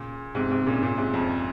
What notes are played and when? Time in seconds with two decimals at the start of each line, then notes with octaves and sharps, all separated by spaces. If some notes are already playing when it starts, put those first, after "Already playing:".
Already playing: A#2 C#3
0.35 G#2 C3
0.50 G#2 C3
0.66 A#2 C#3
0.82 A#2 C#3
0.97 G#2 C3
1.14 F2